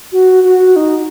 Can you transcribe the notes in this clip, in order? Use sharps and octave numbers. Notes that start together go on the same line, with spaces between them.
F#4
F#4
D#4